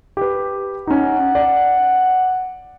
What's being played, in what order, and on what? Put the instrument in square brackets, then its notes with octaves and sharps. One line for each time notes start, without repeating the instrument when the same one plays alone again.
[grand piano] G4 B4
[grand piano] C#4 D#4 [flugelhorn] F#5
[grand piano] D5